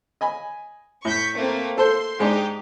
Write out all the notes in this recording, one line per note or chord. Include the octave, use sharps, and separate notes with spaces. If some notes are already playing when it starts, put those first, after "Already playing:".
D#5 G#5 B5
A2 C#6 G6 B6
A3 A#3 C4
A4 C5 C6
G#2 G#3 D4 D#4 G4